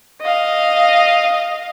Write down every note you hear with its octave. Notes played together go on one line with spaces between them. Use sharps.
D#5 F5